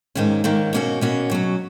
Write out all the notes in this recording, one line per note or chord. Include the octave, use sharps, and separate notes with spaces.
G#2 D#3 A#3 C#4
G#2 D#3 A#3 C#4
B2 A#3 C#4 F#4
B2 A#3 C#4 F#4
B2 F#3 C#4